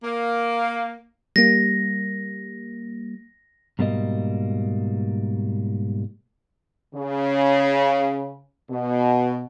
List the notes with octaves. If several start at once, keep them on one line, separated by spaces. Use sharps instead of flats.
A#3
G3 A#3 A#6
G#2 B2 G3 A#3 D#5
C#3
B2